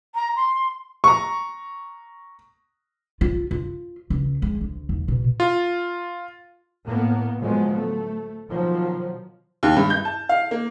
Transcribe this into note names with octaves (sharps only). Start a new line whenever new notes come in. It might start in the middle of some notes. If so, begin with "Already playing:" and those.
A#5
C6
A#5 C#6
F4
F4
C#2
G#3
D2
D#2
B2
F4
A2 A#3 B3
A2 D3 F3 F#3 G#3 B3
A3
B2 D#3 F3 F#3
D#2
G2
G6
A5
F5
A#3